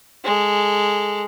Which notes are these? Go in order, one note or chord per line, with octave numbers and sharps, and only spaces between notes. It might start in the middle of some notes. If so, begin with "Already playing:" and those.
G#3 A4